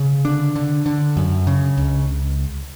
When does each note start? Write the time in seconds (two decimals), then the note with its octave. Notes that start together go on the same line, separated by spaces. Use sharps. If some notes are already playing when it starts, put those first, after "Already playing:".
Already playing: C#3
0.25 D3 D4
0.56 D3
0.86 D3
1.17 F#2
1.47 C#3
1.77 C#2